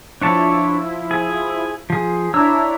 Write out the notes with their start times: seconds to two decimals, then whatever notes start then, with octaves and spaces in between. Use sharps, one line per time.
0.21 F3 D4 E4 C#5 A5
1.11 G#4
1.90 F3 G#4
2.34 D4 E4 C#5 A#5 E6